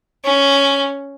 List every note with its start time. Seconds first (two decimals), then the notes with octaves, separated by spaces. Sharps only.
0.24 C#4